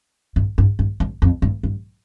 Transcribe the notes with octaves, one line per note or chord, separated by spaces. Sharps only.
G2
G2
G2
G2
F2
G2
G2